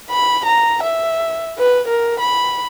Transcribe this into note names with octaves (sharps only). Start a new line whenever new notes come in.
B5
A#5
E5
B4
A#4
B5